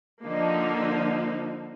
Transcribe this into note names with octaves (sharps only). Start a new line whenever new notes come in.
D3 F3 A#3 D#4